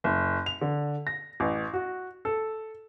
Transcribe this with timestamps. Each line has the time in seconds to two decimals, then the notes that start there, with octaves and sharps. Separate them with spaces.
0.04 F#1
0.46 F7
0.61 D3
1.07 A#6
1.40 A1
1.74 F#4
2.25 A4